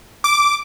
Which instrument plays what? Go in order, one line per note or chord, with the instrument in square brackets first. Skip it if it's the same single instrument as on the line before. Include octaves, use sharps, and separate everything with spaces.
[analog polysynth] D6